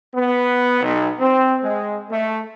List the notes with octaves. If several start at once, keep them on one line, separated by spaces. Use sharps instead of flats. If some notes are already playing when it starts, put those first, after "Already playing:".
B3
B1
C4
G#3
A3